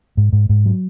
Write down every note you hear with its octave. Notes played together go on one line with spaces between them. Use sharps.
G#2
G#2
G#2
F#3